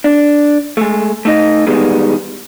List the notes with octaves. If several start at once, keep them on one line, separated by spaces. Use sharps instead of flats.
D4
G#3 A3
A3 D#4 D#5
E2 B2 D#3 G3 G#3 B3